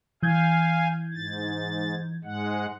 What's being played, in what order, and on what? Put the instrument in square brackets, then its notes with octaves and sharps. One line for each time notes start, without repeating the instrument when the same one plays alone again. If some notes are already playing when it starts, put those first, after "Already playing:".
[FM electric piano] E3 G6 G#6 [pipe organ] F5 G#5
[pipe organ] G#2 A6
G#2 G#3 F#5